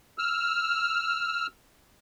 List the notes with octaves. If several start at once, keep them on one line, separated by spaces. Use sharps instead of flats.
E6 F6